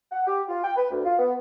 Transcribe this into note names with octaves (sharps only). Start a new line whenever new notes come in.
F#5
G4
F4
G5
B4
D2
F4
B3